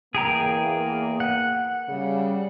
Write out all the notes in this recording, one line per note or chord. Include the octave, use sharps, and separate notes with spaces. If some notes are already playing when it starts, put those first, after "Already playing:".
E2 A#3 G#4 G5 A#5
F#5
C#3 G3